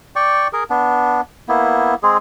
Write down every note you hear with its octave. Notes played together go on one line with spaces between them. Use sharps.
D5 G5 C#6
G#4 A#4
B3 D4
A#3 B3 E4
G#3 C4 G#4